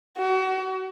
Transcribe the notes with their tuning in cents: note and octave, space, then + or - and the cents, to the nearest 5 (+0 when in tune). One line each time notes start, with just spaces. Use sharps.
F#4 +30